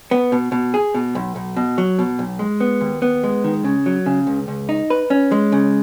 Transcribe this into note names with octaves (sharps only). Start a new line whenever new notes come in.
B3
B2
B2
G#4
B2
B1
B1
B2
F#3
B2
B1
G#3
B3
D#2
B3
G#3
D#3
C#3
F#3
C#3
C#2
C#2
D#4
B4
C#4
G#3
C#3